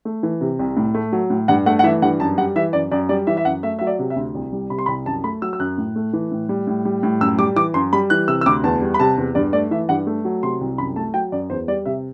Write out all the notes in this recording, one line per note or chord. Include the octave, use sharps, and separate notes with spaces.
A3
E3
C3
C2
A2
A3
F#3
A2
G2 F#5
A3 F#5
F#5
E3 E5
G2 F#5
F#2 A5
G3 F#5
E3 E5
F#2 D5
F#2 D5
G3 D5
E3 E5
E5
F#2 F#5
A3 E5
F#3 E5
D5
C3
E5
D2
C2
G3
C3 B5
C6
C2 B5
F#2 A5
A3 B5
F#3 E6
E6
F#2 F#6
A2
A3
E3
A2
G3
A2
G3
A2
F#2 E6
G3 D6
E3 D6
F#2 C6
G3 B5
E3 F#6
C3 E6
E6
D2 D6
E2 A5
G3
B5
C3 A5
E2
G2 D5
A3 D5
E3 E5
G2 F#5
A3
F#3
C3 C6
C2
F#2 B5
A3 A5
F#3 G5
F#2 D5
E2 C5
G3 D5
C3 E5